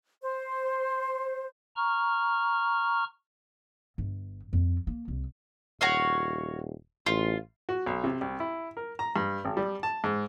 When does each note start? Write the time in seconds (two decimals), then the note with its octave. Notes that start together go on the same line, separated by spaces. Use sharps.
0.22 C5
1.76 A#5 C#6 F6
3.98 G1
4.53 F2
4.87 A#3
5.08 C2
5.81 D#1 F#4 C#5 F5
7.06 A1 F4
7.69 F#4
7.86 B1
8.04 C3
8.21 C2
8.40 E4
8.77 A#4
8.99 A#5
9.16 G2
9.45 G#1
9.57 G3
9.83 A5
10.04 G#2